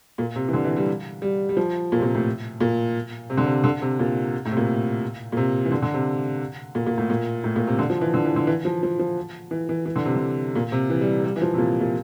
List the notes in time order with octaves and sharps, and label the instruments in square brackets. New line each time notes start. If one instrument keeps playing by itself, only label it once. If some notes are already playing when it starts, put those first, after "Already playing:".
[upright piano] A#2
C3
E3
D3
E3
G3
G3
G3
F3
A#2
C3
A#2
A2
A#2
C3
D3
C3
D3
C3
A#2
A2
C3
A#2
A#2
C3
E3
D3
D3
C3
A#2
A#2
A2
A#2
A2
A#2
C3
D3
F3
E3
D3
E3
D3
E3
F3
F3
F3
E3
E3
E3
D3
C3
D3
A#2
C3
E3
G3
G3
E3
F3
C3
A#2
A#2